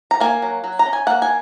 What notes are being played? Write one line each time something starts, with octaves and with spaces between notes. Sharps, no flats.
A#5
A#3 G#5
F#3
F#3
A#5
C#4
G#5
A#3 F#5
G#5